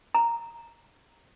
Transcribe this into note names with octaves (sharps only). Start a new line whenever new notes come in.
A#5